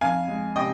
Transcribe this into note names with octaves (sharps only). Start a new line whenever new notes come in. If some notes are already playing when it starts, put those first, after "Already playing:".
F2 F5 G#5
G#3
C3 D#5 G5